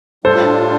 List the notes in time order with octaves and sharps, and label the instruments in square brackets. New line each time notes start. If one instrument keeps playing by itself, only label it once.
[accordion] A2 G3 D4 F4 [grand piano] A4 C5